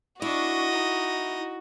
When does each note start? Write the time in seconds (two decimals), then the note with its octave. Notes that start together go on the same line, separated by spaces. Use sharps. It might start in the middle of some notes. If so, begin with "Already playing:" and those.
0.22 D4 E4 F#4 D#5 C#6
0.71 D#4